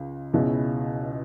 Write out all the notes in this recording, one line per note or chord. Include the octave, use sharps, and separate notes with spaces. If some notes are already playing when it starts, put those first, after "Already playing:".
Already playing: C#2 C#3
C#2 B2 G#3 C#4 E4